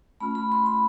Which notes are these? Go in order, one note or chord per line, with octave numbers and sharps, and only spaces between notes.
A3 C#4 F4 B5
B5
C6
B5